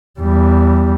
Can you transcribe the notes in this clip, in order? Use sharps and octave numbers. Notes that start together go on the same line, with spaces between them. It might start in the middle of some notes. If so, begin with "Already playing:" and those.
E2 G3